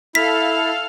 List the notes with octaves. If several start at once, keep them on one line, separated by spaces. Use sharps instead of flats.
E4 A4 F5 F6 B6